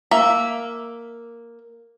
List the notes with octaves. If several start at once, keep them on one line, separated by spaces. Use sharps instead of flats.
A#3 E5